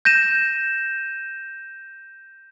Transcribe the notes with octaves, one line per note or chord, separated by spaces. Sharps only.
G6 A#6 D#7 E7